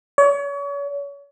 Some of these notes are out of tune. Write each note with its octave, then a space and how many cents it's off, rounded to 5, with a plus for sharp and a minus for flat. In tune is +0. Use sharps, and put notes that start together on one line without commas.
C#5 +35